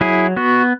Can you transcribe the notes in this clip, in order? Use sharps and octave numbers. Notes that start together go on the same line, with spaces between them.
F#3 E4 G#4
B3 F#4